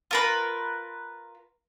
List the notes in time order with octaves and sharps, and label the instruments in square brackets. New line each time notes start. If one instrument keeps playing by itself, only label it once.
[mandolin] F4 A#4 B4